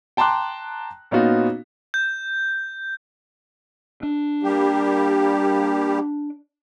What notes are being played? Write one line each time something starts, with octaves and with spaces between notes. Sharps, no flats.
G5 A5 A#5 C6 D6 F#6
A#2 B3 C#4 D#4 F4 F#4
G6
D4
G3 A#3 G4